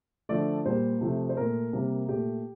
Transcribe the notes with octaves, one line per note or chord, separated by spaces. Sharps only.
D3 F3 A3 D5
A#2 G3 A#3 C5
C3 F3 A3
C5
A#2 A3 A#4
C3 G3 A#3
A#2 A3 G4